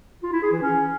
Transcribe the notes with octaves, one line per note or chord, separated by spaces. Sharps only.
F4
E4
G#4
E3
C#4